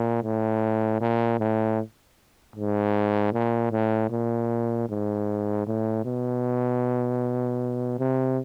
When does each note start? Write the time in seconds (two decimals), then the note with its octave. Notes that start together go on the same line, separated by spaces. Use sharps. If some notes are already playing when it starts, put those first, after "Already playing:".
Already playing: A#2
0.23 A2
1.01 A#2
1.39 A2
2.56 G#2
3.33 A#2
3.71 A2
4.11 A#2
4.89 G#2
5.67 A2
6.05 B2
7.99 C3